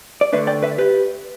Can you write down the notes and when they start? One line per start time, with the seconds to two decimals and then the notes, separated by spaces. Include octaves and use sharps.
0.21 D5
0.33 D2 D3 A3 D4 B4 E5
0.47 D5 G5
0.63 B4 E5
0.78 G4 B4